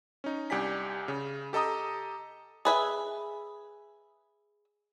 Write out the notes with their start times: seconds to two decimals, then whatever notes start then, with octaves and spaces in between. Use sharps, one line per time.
0.24 C#4 D#4
0.50 C2 G4 D5 G#5 B6
1.08 C#3
1.53 G4 A4 D#5 A#5 D#6
2.65 G#4 B4 E5